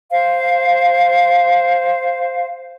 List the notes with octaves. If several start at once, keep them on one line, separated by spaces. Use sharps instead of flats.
C5 F5